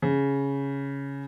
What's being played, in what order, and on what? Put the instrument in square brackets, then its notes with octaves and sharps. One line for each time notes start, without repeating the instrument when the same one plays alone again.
[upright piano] C#3